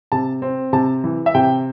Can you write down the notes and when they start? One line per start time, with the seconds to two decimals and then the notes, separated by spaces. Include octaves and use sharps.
0.12 C3 A5
0.42 C4
0.73 C3 A5
1.04 E3
1.26 E5
1.35 C3 G5